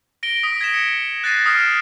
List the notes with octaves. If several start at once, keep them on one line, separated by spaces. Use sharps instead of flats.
A#6 D7 G7
D#6 B6
G#6 A#6 B6 D7 E7
C#7
F#6 A6 A#6 C7 D#7
D#6 F6 C7 D7 E7